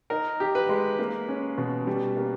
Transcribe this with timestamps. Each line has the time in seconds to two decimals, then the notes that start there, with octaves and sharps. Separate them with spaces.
0.10 D#4 A#4
0.40 G4
0.55 B4
0.69 G#3
0.99 A#3
1.28 C#4
1.58 B2
1.87 G3
2.17 A#3